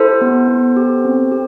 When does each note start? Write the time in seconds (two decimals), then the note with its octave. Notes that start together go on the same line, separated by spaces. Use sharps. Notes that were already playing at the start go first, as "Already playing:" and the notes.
Already playing: E4 G4 A4 C5
0.21 B3
0.48 B3
0.76 G4
1.05 C4
1.32 G4